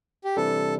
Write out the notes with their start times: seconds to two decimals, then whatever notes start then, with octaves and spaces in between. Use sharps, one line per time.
0.24 G4
0.37 C3 E3 G3 D4 A4